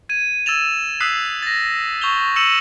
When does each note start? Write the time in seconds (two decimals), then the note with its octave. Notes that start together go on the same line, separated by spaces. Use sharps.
0.09 G#6 D#7
0.46 E6 G#6 A6 E7 F7
1.00 D#6 E6 F#6 B6 C7
1.43 A6 A#6
2.01 C#6 G6 F7 G7
2.36 E6 C#7 D#7 E7 F#7